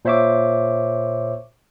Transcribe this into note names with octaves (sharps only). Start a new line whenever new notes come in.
A#2 C5 C#5 E5 C#6 D6